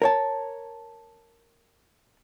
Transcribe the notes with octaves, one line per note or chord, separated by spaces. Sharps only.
A#4 C#5 A5